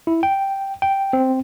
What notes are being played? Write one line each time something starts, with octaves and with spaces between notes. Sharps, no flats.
E4
G5
G5
C4